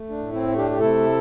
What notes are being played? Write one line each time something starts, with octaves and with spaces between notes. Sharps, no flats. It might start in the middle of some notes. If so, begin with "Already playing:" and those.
Already playing: A3
D4
A2
C4 E4
A3
D4 G4
G4
C3 E4 A4